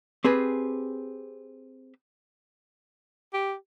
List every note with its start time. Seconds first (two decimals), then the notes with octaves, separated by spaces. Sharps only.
0.24 C4 G4 G#4 B4
3.33 G4